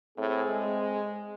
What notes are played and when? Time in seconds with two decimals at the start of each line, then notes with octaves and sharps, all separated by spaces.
0.18 A2 C4 G#4
0.49 G#3